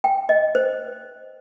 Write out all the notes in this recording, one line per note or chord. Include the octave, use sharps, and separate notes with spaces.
G5
D#5
C5